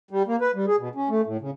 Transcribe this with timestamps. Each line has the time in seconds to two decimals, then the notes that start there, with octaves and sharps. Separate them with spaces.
0.11 G3
0.27 A#3
0.41 B4
0.55 G3
0.67 G#4
0.79 B2
0.95 C#4
1.09 A3
1.26 A2
1.41 C#3